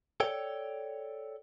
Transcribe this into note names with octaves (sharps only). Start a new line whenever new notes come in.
A4 C#5 D5 G5